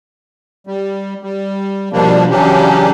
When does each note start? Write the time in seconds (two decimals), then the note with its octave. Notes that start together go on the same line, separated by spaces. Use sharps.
0.67 G3
1.23 G3
1.93 B2 F3 G3 A#3 D4
2.30 C#3 E3 F#3 C#4 D4 G4